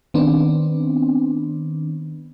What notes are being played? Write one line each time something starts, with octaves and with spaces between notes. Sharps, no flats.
D#3 B3 C4 D4